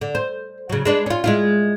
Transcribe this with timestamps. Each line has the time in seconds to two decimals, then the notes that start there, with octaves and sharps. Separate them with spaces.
0.01 D3
0.15 C5
0.70 C#3 F#3
0.85 G#3 D4 B4
1.06 C#4 F4
1.24 G#3 E4 F4